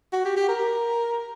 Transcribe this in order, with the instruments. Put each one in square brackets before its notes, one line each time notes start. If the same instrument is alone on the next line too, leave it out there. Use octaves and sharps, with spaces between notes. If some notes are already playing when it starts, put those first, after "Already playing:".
[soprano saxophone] F#4
G4
G4
A#4